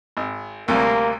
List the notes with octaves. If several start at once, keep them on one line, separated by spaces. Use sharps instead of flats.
G#1
D2 C3 G3 A#3